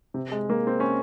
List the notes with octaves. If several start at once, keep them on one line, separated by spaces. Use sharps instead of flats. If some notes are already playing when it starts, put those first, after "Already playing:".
C3
G#3
A#3
C4
C#4